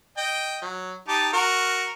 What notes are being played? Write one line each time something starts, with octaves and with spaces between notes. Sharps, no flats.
D#5 G5
F#3
D#4 G4 A5
F#4 A#4